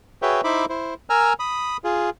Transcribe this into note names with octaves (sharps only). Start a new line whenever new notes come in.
F#4 G#4 B4 C#5 E5 G5
D#4 E4 C5 E5 B5 D6
E4 C5
A#4 G#5 A#5 E6 F6
B5 D#6
F4 G#4